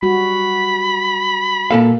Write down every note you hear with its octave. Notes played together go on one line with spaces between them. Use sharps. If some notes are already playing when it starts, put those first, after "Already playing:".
G3 F#4 B5
A#2 A#3 A4 F5